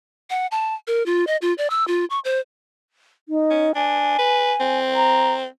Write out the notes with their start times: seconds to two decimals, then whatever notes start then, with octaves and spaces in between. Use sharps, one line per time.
0.30 F#5
0.51 A5
0.87 A#4
1.06 F4
1.27 D#5
1.42 F4
1.58 D5
1.70 E6
1.88 F4
2.10 C#6
2.25 C5
3.29 D#4
3.50 C#4
3.75 D4 G#5
4.18 B4
4.60 C4
4.96 A#5